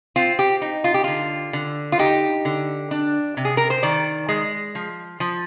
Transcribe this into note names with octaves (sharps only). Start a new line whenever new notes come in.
C4 F4
G4
D#4
F4
G4
D3 F4
D3
F4
D#4 G4
D3
D4
C3
G#4
A#4
C5
D#3 D5
G#3
F3
F3